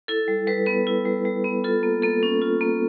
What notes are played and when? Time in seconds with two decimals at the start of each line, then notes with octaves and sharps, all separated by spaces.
0.08 E4 A4
0.28 G3
0.47 G3 B4
0.66 B3 B4
0.87 E4
1.05 G3
1.25 G3
1.44 B3
1.64 F4 A4
1.83 A#3
2.02 A#3 A4
2.23 C#4
2.42 F4
2.61 A#3